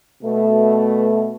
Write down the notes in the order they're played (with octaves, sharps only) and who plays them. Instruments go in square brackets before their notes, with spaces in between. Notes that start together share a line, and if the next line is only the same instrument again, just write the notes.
[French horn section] B2 A3